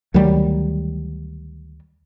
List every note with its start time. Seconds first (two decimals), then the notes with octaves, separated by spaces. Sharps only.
0.14 D2 D#3 F#3 G3